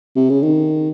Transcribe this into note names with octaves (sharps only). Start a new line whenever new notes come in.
C3
C#3
D#3